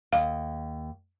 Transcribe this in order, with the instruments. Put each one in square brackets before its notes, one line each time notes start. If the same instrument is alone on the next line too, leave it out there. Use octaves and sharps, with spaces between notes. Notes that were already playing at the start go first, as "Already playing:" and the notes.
[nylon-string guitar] D#2 D#5 [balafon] F5